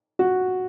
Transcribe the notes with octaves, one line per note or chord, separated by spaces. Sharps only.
F#4